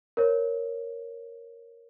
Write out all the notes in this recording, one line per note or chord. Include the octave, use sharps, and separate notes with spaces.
A#4 C5 C#5